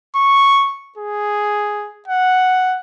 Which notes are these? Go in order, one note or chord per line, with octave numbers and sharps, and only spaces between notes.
C#6
G#4
F#5